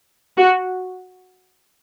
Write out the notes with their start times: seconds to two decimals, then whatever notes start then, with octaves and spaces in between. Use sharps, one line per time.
0.37 F#4